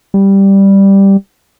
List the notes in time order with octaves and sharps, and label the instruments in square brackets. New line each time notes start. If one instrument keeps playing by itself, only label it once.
[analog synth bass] G3